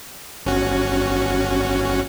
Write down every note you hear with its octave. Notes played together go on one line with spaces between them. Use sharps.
G1 C#4 F#4